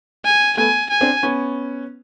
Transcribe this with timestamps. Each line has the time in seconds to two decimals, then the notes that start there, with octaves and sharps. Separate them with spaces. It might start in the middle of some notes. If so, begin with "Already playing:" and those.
0.25 G#5
0.57 A3 B3 G#5
0.90 G#5
1.01 C4 D4
1.23 B3 C#4